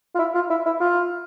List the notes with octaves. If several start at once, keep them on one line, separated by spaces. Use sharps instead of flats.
F4
E4
F4
E4
E4
F4